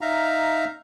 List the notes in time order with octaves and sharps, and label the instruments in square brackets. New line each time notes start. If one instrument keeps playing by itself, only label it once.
[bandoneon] D#4 E5 F5 A#5